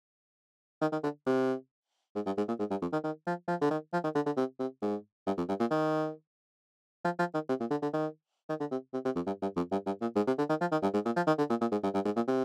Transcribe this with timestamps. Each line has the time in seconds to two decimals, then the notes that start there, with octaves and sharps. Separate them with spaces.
0.81 D#3
0.92 D#3
1.03 D3
1.27 C3
2.16 G#2
2.26 G2
2.38 G#2
2.48 A#2
2.60 G#2
2.71 G2
2.82 F2
2.93 D#3
3.04 D#3
3.27 F3
3.48 F3
3.62 D3
3.71 D#3
3.93 F3
4.04 D#3
4.15 D3
4.26 D3
4.37 C3
4.60 C3
4.82 G#2
5.27 G2
5.38 F2
5.49 G2
5.60 A#2
5.71 D#3
7.05 F3
7.19 F3
7.34 D#3
7.49 C3
7.60 A#2
7.71 D3
7.83 D3
7.93 D#3
8.49 D#3
8.60 D3
8.72 C3
8.93 C3
9.05 C3
9.16 F2
9.27 G2
9.42 G2
9.57 F2
9.72 G2
9.86 G2
10.01 A#2
10.16 G#2
10.27 C3
10.38 D3
10.49 D#3
10.61 F3
10.72 D#3
10.83 G2
10.94 G#2
11.05 A#2
11.17 F3
11.27 D#3
11.38 D3
11.50 A#2
11.61 A#2
11.72 G#2
11.83 G2
11.94 G2
12.05 G#2
12.16 A#2
12.28 C3